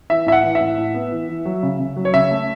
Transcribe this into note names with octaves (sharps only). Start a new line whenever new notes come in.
E3 E5
A2 E5
F#5
E3
E5
A2
A2
B3
E3
E3
F#3
C#3
C#3
F#3
C#5
C#3 E5
A3